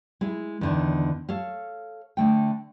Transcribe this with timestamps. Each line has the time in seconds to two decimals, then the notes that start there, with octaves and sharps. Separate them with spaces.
0.21 G#3 E4
0.61 E2 D3 D#3
1.29 A4 C#5 F5
2.17 D3 A3 G5